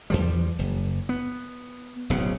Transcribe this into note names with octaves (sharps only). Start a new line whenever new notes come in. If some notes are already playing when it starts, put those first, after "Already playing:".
E2 F3 G3
F#1
B3
D1 B1 C#3 B3